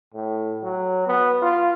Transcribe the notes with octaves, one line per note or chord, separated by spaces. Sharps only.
A2
F#3
B3
F4